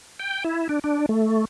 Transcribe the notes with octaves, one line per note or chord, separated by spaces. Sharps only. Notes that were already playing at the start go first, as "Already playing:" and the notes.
G5
E4
D4
D4
A3